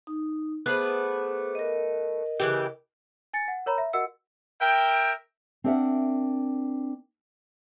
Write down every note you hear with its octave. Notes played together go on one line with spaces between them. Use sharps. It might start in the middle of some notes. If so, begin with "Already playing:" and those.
D#4
A3 B3 G#4 B4 C5 D6
A#4 D#5
C#3 E3 G4
G#5 A6 C#7
F#5
A#4 C#5 A#5 B5
E5
F#4 A#4 D#5 F#5 E6 C#7
A#4 E5 G5
C4 D4 A#4 D5 E5 F#5